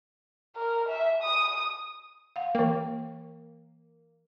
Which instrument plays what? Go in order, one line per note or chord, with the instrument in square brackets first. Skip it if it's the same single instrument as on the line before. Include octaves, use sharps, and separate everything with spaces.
[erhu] A#4
E5
D#6
[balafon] F5 F#5
[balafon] E3 G5 [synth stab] A#3